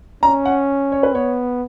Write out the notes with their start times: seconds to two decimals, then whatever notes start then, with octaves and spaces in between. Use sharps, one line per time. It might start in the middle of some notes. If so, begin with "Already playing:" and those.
0.23 C#4 A#5
0.46 F#5
0.92 C#5
1.03 B4
1.15 B3 C#5